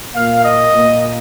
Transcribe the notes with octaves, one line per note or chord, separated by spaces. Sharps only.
A#2 A#3 F5
D#5
A#2 A#3